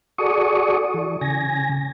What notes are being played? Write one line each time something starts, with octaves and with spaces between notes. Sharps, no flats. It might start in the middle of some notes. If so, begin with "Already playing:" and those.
F#4 G#4 A4 D5 C#6 D#6
E3
C#3 G#5 A#6